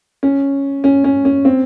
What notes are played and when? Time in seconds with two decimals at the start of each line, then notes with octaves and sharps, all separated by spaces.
0.23 C#4
0.84 C#4
1.04 C#4
1.25 C#4
1.45 C4